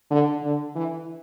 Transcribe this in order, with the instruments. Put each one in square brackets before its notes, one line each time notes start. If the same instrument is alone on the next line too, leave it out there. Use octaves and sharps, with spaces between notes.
[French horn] D3
D3
E3